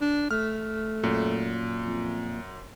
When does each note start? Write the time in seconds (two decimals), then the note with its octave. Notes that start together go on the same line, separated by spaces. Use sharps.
0.01 D4
0.31 A3 F6
1.04 F#2 A#2
1.82 F2